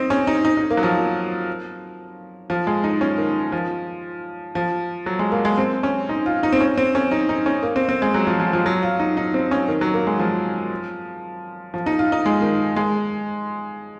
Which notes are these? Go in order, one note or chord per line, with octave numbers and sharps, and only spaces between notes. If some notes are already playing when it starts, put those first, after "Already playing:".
Already playing: C4 D#4
C#4
D#4
D#4
D#4
A#3
F#3
F3
F3
G#3
D#4
C#4
D#3
F3
F3
F#3
G#3
A#3
G#3
C4
C#4
D#4
F4
D#4
C4
C#4
C4
C#4
D#4
D#4
C#4
A#3
C4
C4
G#3
F#3
F3
F3
F3
F#3
F4
D#4
D#4
C4
C#4
D#3
F#3
A#3
G#3
F3
F3
D#4
F4
D#4
G#3
D#3
G#3